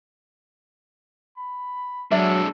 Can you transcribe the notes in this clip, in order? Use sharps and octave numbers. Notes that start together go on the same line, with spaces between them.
B5
F#3 G#3 D4 A4 D5 E5